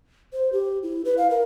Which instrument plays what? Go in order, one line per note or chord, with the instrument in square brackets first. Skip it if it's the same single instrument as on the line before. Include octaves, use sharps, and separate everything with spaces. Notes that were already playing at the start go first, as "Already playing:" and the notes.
[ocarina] C5
G4
E4
B4
F5
A#4